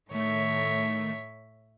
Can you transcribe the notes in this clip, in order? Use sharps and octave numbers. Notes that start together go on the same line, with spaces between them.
A2 D#3 A3 C#5 E5